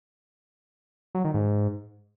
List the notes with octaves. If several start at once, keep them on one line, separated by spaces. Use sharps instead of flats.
F#3
D#3
G#2